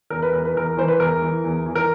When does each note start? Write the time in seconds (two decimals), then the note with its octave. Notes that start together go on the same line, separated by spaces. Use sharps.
0.10 E2 A#4
0.22 B4
0.33 E2 A#4
0.45 B4
0.55 E2 A#4
0.77 E3 C5
0.88 B4
0.99 E2 A#4
1.22 E3
1.44 E2
1.66 E3
1.75 A#4